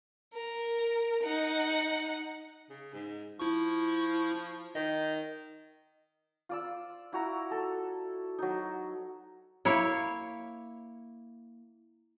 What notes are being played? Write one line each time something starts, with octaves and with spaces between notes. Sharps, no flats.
A#4
D#4 F#5
C#3
G#2
F3 E4 C#6
D#3 D#5
F4 D5 E6
E4 F#4 A#5
A4
F#3 D#4
A#3 E4 C#5 F5